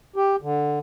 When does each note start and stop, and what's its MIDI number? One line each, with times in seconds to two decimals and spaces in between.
0.16 0.36 67
0.42 0.79 50